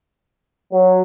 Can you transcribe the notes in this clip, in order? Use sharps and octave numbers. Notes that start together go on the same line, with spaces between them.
F#3